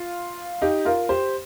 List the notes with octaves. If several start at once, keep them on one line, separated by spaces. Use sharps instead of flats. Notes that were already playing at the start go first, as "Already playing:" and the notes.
Already playing: F4
D#4 G4
F4 A#4
G4 C5